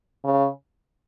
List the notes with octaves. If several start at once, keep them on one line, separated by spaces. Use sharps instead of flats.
C#3